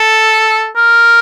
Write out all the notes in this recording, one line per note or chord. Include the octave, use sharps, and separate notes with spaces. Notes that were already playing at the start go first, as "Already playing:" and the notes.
Already playing: A4
A#4